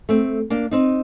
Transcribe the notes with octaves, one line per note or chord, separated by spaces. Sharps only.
A3 C4
A#3 D4
C4 D#4